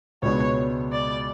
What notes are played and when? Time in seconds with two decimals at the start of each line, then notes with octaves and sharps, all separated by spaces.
0.22 C#2 B2 G#3 B3 D4 C#5
0.92 D5